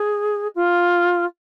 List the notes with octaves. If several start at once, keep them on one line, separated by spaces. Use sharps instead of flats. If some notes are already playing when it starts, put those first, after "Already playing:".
Already playing: G#4
F4